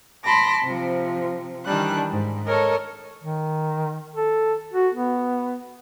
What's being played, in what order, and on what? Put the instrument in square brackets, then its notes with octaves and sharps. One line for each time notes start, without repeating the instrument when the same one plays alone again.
[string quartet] A5 B5 C6 D6 A#6
C3 F3
D#3 E3 G3 D4 F#6
G#2
A4 A#4 C#5 D#5
[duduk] D#3
A4
F#4
B3